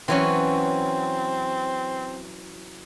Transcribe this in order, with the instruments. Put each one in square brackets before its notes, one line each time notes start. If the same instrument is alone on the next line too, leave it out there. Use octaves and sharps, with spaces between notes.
[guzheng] E3 F#3 C#4 [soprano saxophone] C4